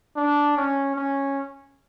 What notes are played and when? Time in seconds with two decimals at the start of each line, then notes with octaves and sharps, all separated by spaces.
0.16 D4
0.57 C#4
0.96 C#4